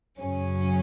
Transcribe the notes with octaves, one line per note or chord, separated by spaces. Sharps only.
F#2 C#3 F#3 C#4